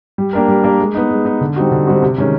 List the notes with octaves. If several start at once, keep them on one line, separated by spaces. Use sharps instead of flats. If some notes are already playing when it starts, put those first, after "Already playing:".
G3
A#3 D4 G4 A#4
G3
A#3 D4 G4 A#4
G#3
B3 D#4
G#3
B3 D#4
D3
G3 C4 D#4 F#4
D3
G3 C4 D#4 F#4
C3
D#3 G#3 C#4